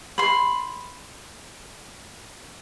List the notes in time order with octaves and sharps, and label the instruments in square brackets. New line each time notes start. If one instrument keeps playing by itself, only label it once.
[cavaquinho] B5 C6